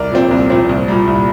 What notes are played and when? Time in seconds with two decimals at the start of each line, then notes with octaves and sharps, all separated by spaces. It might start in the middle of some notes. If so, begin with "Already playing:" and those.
Already playing: C2 A#4 D5
0.11 A#2 F3 C4
0.31 C2
0.50 A#2 F3 C4
0.69 C2
0.88 A#2 G3
1.07 C2